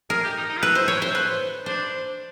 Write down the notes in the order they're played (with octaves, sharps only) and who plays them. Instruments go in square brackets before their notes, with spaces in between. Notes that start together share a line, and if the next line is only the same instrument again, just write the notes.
[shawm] G#4 [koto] A#4
[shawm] G4
D#4
D#4
F4
[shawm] E4 [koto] B4
[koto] C5
C#5
C5
B4
[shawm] D4 [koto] C5